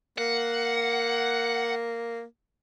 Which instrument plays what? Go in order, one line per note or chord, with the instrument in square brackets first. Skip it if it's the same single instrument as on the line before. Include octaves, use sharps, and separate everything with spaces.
[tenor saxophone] A#3 [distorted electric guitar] F#5